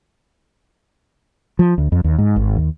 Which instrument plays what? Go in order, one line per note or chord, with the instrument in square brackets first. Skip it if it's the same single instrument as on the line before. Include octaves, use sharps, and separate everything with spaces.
[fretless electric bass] F3
D2
F2
D#2
G#2
G#1
D#2